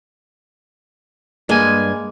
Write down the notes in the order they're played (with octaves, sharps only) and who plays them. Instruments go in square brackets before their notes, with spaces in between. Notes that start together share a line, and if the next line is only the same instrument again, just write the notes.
[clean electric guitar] G2 G#5 [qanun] G#3 A#3